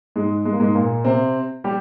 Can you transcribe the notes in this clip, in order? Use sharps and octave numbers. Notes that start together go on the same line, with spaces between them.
G#2 G#3
G#3
A#3
G#2 G#3
A#2 A#3
C3 C4
G3 G4